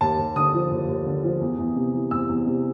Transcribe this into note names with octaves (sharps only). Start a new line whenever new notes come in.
D#2 A5
D#2
D3 D#6
F3
D#2
D#2
D3
F3
E2
E2
C3
E3
E2 E6
E2
C3